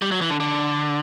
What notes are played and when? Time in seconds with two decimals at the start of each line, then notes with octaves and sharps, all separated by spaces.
0.02 G3
0.11 F#3
0.21 E3
0.30 D3
0.40 D3